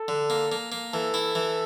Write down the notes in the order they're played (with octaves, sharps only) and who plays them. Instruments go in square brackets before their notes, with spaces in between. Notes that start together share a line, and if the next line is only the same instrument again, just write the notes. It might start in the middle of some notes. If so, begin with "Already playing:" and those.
Already playing: [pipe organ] A4
[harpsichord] D3
A#3
A#3
A#3
[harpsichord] E3 [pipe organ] A4
[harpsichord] E4
E3